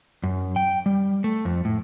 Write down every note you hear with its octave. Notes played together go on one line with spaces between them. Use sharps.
F#2
G5
G3
A3
F2
A2